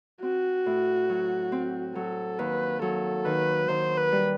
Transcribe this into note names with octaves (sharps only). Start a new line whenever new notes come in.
C4 F#4
A2
F#3
C4
F#3 A4
D#2 B4
F#3 A4
D#3 B4
D#3 C5
B4
G3